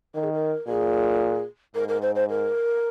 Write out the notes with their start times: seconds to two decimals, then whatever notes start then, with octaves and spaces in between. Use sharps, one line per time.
0.15 D#3 A#4
0.24 G#4
0.33 A#4
0.68 A#2 G#4
1.75 G#2 A#4
1.89 A#4
2.02 C5
2.15 C5
2.30 A#4